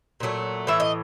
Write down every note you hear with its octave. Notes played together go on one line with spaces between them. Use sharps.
A#2 F#3 A3
A2 E3 E5
D#5